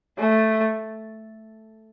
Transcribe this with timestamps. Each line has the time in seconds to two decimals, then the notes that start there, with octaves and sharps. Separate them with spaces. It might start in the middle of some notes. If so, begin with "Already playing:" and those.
0.19 A3